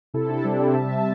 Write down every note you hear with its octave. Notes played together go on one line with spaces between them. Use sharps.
C3 E4 A4
D4 G4
G3 C4 E4
D5 G5
C3 E5 A5